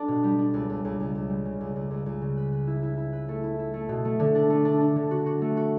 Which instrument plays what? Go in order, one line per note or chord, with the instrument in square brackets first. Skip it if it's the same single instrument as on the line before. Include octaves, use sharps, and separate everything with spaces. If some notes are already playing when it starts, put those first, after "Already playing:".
Already playing: [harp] D4 A4
B2
G3
D4
C#2
C#2
C#2
C#2
C#2
G3
C#3
C#2
C#2
C#2
C#2
C#3
B4
B4
E4
E4
E4
B4
A3
E4
E4
A3
B2
A3
D3
D4
A3
D4
D4
D3
F#4
F#4
A3
F#4